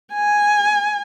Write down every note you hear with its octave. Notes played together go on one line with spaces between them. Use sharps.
G#5